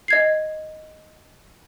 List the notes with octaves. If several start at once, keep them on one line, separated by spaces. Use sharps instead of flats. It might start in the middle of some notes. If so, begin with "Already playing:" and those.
D#5 G#6 C7